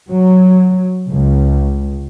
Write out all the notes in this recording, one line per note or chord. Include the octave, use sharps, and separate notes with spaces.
F#3
C#2